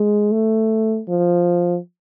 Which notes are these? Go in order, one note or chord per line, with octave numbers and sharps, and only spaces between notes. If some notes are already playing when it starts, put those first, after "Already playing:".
Already playing: G#3
A3
F3